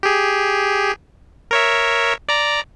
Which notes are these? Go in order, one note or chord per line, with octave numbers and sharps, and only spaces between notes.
G4 G#4
A#4 C#5 E5
D5 A#5